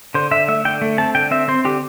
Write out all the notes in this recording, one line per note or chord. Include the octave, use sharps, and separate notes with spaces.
D3 C5
D3 E5
A3 E5
D3 G5
A3
C4 A5
D3 G5
C4 E5
C4 C5
D3 G4